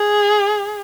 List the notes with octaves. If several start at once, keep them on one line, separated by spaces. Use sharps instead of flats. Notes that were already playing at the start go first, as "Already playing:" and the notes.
Already playing: G#4